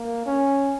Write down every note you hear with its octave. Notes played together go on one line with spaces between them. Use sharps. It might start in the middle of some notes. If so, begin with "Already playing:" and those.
Already playing: A#3
C#4